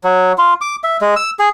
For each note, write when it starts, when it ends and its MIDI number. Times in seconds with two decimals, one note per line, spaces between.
0.04 0.33 54
0.38 0.54 65
0.61 0.76 86
0.84 0.97 76
1.01 1.14 56
1.16 1.31 88
1.39 1.49 68